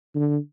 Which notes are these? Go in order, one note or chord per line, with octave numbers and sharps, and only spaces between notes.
D3